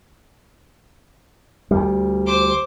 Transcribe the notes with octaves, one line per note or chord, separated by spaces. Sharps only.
D2 G3
C5 D6